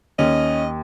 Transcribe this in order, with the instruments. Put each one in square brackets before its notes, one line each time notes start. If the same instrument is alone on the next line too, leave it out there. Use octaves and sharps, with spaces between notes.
[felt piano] D#2 [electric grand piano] C#4 [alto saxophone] D#5